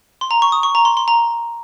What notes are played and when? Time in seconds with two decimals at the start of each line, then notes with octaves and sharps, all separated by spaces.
0.21 C6
0.31 A#5
0.42 C#6
0.52 D#6
0.63 C#6
0.75 A#5
0.85 C6
0.97 C6
1.08 A#5